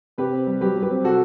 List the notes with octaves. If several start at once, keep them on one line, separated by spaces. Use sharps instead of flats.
C3 G4 B4
C4
G3
F#3 G4 B4
F#3
G4 B4
C4
C3 F#4 A4